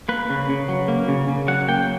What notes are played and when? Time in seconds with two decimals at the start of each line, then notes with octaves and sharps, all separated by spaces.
0.09 A#3 B4
0.30 C#3
0.49 C#3
0.69 F#3
0.88 A#3
1.08 C#3
1.28 C#3
1.48 F#3 F#5
1.69 A#3 G5